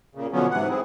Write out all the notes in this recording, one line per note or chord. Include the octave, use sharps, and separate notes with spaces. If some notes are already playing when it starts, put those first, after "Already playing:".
A#2 C#3
B2 D3 F3 F#3 B3 C#4
G#2 C3 E3 F#5
C4 E4 G#4